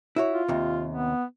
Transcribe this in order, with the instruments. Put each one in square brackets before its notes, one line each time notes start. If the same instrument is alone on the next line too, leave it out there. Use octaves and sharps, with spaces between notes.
[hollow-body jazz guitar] E4 F#4 C#5
[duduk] F4
[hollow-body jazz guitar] D#2 C3
[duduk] B3